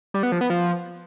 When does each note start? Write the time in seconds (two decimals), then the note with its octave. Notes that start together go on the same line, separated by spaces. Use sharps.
0.14 G3
0.23 B3
0.32 F3
0.41 B3
0.50 F3